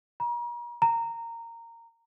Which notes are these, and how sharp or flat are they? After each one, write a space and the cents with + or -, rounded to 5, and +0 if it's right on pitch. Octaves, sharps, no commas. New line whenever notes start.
A#5 +40
A#5 -15